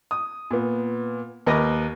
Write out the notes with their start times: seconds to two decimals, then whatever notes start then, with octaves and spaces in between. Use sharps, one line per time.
0.11 D#6
0.51 A#2 B3
1.46 D#2 A#4 B4 D#5 D6 A#6